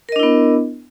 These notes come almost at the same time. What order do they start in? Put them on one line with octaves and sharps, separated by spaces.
A#4 D#5 D4 E4 B3